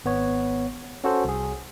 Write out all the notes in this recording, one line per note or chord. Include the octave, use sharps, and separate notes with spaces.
G#1 B3 C#5
C#4 F#4 A4 C5
C2 G#4